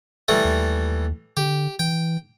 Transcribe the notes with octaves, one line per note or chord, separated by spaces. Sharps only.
E3 G3 A3
D#2
D3 G4
E3 G5